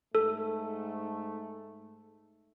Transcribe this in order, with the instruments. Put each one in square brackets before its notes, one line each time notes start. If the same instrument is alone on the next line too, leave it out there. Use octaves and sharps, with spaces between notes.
[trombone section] G#2 A3 [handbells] A4